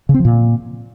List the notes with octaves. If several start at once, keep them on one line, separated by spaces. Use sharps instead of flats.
C#3
C4
F3
A#2